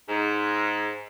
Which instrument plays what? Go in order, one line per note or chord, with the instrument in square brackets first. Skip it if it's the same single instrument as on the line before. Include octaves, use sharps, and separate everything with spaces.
[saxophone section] G#2